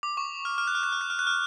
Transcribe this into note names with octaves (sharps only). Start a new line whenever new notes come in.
D6
C#6
F6
F6
F#6
F6
F#6
F6
F#6
F6
F#6
F6